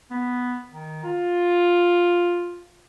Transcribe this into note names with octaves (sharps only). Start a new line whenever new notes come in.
B3
D#3
F4